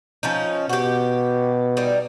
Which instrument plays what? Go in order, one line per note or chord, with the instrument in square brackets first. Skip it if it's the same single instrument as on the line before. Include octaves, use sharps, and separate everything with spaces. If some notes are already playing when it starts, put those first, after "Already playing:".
[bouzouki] F3 C#4 D#4
[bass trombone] B2 [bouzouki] F#4 G4
[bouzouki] G3 D#4